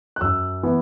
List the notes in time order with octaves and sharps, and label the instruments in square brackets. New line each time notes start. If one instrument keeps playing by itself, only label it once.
[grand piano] F#6
F#2 E6
E3 B3